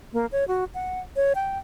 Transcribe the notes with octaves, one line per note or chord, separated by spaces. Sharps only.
A#3
C#5
F#4
F#5
C#5
G5